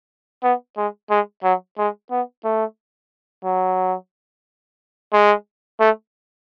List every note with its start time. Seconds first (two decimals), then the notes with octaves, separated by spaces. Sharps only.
0.43 B3
0.77 G#3
1.10 G#3
1.44 F#3
1.78 G#3
2.11 B3
2.44 A3
3.45 F#3
5.13 G#3
5.80 A3